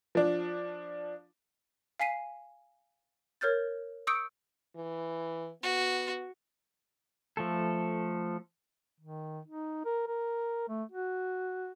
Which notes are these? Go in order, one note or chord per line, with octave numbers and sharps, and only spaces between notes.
F3 D4
F5 G#5 B6 C7 D#7
A#4 C#5 F6 G6 A6
C#6 D#6 E6 G6 C#7 D7
E3
B3 F#4
F3 A3 A4
D#3
D#4
A#4
A#4
A3
F#4